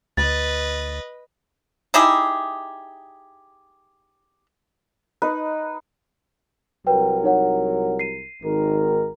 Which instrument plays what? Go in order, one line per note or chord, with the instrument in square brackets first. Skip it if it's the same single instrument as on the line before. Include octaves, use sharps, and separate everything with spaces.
[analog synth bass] D2 [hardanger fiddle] B4 D#5 [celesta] A6
[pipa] D#4 E4 G4 G#4
[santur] D#4 B4
[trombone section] C2 F#3 A#4 [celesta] B4 G5
[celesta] D#4 C#5 F#5
C7 D#7
[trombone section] G#1 D#3 A#4